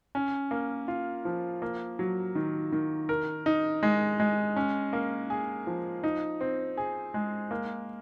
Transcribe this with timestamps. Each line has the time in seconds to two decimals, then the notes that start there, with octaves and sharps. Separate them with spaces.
0.15 C#4
0.51 A#3
0.88 F4
1.25 F3
1.62 A#3
1.99 F#3
2.35 D#3
2.72 D#3
3.09 A#4
3.46 D#4
3.83 G#3
4.20 G#3
4.56 C#4
4.93 A#3
5.30 G#4
5.67 F3
6.04 D#4
6.41 C4
6.77 G#4
7.14 G#3
7.51 A#3